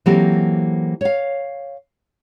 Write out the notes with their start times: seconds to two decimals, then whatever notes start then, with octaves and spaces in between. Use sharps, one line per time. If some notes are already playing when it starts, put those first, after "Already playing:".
0.06 E3 F#3 A#3 C4 G4 A4
1.01 C#5 F5